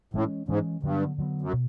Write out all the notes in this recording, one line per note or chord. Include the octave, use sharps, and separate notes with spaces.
A2 E3 G#3 C#4
G#2 E3 G#3 C#4
G2 D3 F#3 B3
D3 F#3 B3
F#2
B2